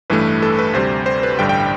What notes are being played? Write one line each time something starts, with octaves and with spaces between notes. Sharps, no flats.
A1 G2 E3 A3 B4
A4
B4
D2 C3 G3 C5
C5
B4
A1 G2 D3 G3 G5
G5
G5